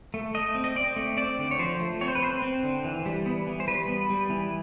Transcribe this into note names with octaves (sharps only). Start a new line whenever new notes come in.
A3
A3 D#5
C4
D#5
C4 D5
A3
C4 D5
D3
C#5
F3 C5
A3
C4 C#5
C5
B4
C4 C5
C4
D3
E3
G3
B3
E3
C5
G3 B4
B3
G3
E3